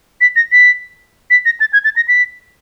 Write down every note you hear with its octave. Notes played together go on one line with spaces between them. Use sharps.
B6
A#6
B6
B6
A#6
A6
G#6
A6
A#6
B6